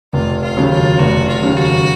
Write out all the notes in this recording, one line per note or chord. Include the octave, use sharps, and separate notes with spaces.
F1 F4
F4
D#2 C#3 F#3
F4
F1 F#4
F4
D#2 C#3 F#3
F#4